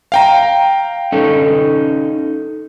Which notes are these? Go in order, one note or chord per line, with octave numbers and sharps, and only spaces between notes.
F5 G5 A#5
C#4 D#4 A4